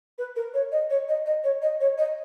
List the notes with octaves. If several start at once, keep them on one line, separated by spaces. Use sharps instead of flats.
B4
A#4
C#5
D#5
C#5
D#5
D#5
C#5
D#5
C#5
D#5